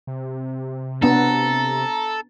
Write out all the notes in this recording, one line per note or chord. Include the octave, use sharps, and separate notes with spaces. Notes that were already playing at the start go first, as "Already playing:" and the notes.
C3
B3 D4 A4 A#5